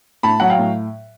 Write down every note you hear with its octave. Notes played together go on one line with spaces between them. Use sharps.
A2 A5 B5
F#3 F#5
F5 G5
A2